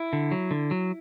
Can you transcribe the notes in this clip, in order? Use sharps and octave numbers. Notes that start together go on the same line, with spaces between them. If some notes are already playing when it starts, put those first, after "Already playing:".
Already playing: E4
D3
F#3
D3
F#3